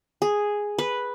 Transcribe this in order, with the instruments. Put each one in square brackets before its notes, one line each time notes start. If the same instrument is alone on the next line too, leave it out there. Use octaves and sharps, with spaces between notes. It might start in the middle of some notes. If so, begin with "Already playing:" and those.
[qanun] G#4
B4